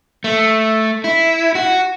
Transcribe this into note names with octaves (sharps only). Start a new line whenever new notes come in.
A3
E4
F#4